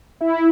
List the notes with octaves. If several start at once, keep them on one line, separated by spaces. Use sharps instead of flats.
E4